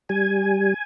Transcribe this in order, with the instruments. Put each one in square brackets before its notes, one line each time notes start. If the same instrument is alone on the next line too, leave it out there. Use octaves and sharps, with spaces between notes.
[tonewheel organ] G3 G#5